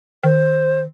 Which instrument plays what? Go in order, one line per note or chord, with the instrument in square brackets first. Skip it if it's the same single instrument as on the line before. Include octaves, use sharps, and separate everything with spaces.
[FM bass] D#3 [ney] C5